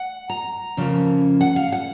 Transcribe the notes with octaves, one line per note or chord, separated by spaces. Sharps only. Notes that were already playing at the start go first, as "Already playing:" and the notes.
Already playing: F#5
A#5
F2 C#3 F3 A#3 C#4
F#5
F5
F#5